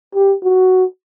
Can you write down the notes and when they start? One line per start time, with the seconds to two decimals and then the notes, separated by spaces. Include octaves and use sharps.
0.15 G4
0.44 F#4